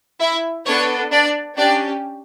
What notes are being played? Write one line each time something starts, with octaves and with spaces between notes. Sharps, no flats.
E4 E5
B3 D4 A4 C#5
D4 D5
C#4 D4 G4 D5